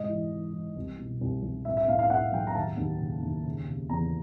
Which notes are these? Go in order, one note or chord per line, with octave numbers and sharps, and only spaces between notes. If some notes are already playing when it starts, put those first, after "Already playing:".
Already playing: G#2 C3 D#5
E3
E3
E3
C2
B2
C2
C2
A2 E5
E5
A2 F5
F5
A2 F#5
F#3 G5
A#5
D#2 A5
D#2
C#3
D#2
C#3
C#3
E2 A#5